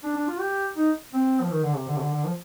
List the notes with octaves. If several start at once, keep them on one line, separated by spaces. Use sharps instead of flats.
D4
D4
F4
G4
D#4
C4
F3
D#3
D3
C3
D3
C3
D3
D3
F3